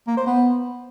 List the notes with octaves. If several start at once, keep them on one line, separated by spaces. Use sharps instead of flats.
A#3
C5
B3